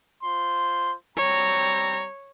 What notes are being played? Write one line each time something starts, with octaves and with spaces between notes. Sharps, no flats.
F4 C5 C6
G3 C4 C#5 A#5